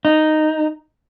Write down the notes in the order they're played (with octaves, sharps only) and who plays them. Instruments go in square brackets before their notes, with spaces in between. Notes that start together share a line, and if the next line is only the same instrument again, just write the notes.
[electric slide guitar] D#4